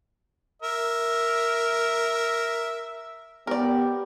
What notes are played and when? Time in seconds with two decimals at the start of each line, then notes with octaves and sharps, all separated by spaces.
0.62 A#4 E5
3.47 B3 G4 A#4 D5